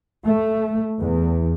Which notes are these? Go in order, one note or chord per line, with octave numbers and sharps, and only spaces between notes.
A3
E2